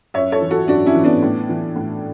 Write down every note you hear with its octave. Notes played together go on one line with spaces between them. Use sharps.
F#2 C#5 E5
A4 C#5
E3
F#4 A4
F#2 D4 F#4
C#4 E4
E3
B3 D4
A2
E3
A2